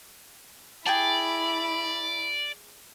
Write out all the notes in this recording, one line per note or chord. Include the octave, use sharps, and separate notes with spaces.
E4 G#4 D5 G5 A5 B5